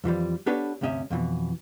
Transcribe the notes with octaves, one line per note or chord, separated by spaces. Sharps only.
F2 E3 F3 G3
B3 D4 G4 A4 B4 C#5
D2 G2 C3 C#4 D#5 E5
F2 B2 D#3 E3